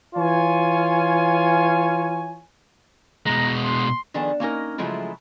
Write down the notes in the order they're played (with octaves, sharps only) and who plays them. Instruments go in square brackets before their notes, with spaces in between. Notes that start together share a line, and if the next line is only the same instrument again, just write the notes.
[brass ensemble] E3 F4 C#5 G#5
[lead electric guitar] B2 G#3 [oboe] A#5
[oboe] C6
[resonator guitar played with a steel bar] D#3 F3 B3 D4 G#4 A4
A#3 C#4 D#4 A#4
C#3 F3 F#3 G#3 A3 E4